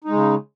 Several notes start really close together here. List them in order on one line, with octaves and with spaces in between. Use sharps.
D#4 G#3 C#3